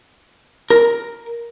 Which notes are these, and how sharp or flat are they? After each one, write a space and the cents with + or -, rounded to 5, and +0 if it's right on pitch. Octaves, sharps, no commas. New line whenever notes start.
A#4 +10